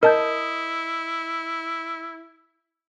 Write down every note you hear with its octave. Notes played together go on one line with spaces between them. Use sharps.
E4 A#4 D#5 A5 G6